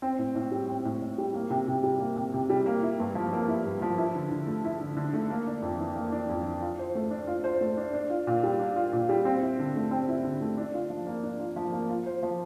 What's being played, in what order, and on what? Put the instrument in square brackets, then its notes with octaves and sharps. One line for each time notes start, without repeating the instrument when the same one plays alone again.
[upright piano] C4
A2
A2
G3
C4
A2
A2
G3
A#3
C3
C3
G3
A#3
C3
C3
G3
A#3
E4
G2
F3
A#3
E4
G2
F3
E4
D3
D3
A3
E4
D3
D3
A3
A#3
D4
F2
E3
A#3
D4
F2
E3
F4
C5
A3
D4
F4
C5
A3
D4
D4
F4
A#2
G3
D4
F4
A#2
G3
C4
E4
D3
A3
C4
E4
D3
A3
D4
F4
F3
A#3
D4
F4
F3
A#3
F4
C5
F3